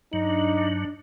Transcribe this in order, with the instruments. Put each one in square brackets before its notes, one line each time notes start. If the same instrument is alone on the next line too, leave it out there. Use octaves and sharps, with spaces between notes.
[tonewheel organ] G2 F#3 [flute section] D4 [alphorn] D#4